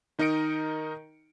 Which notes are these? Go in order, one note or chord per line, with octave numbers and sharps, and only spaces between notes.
D#3 D#4 A#4 D#5 C#7 D7